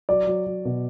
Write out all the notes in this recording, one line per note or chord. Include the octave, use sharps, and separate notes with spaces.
F#3 D5
F#3
F#3
B2